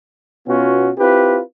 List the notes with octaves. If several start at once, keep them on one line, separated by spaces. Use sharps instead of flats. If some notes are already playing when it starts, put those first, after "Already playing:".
B2 B3 C#4 F4 F#4
C4 E4 F4 G4 B4